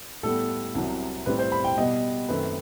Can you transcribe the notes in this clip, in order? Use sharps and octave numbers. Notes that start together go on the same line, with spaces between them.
A2 G3 B3 A4
C2 C3 F#3
A2 G3 C4 B4
C5
B5
G5
B2 G3 B3 D#5
F#2 D#3 A3 C4 B4